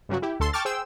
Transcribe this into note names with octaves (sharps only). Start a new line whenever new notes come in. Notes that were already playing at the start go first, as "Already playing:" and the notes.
G2 C#3 F#3 F#4
E4 G4
D2 A4 C6
G5 A5 C#6 D6 F6 A6
G#4 C5 G5 E6